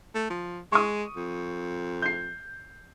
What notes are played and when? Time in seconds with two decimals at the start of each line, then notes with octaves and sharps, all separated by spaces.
0.15 A3
0.30 F3
0.72 G#3 C#6 D#6
1.16 F2
2.02 G6 C7